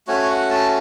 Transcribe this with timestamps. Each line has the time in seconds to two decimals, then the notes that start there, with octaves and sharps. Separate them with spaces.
0.08 A3 C#4 F#4 C#5
0.30 F#5
0.51 A5